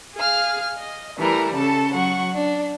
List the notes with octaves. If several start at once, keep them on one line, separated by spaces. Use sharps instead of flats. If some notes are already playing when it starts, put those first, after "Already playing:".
G#4 F5 F6
D#5
E3 G3 A3 A#4
C#3 A4 A5
F#3 F#5 C#6
D4